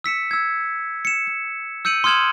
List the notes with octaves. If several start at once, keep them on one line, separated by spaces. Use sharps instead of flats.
E6 B6 C#7 E7
E6 G#6
C#7 E7
C#7
E6 G6 C#7 D#7 F#7
C6 D#6 F6 G#6 E7 F#7